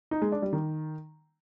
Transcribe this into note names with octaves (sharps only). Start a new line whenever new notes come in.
D#4
G#3
D4
G3
D#3